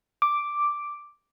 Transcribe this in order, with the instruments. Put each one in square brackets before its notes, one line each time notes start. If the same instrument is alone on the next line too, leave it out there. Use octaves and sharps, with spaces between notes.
[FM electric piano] D6